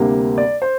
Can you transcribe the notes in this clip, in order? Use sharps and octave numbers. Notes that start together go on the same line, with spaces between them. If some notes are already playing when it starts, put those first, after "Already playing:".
Already playing: D2 C3 G3 A#3
D5
C5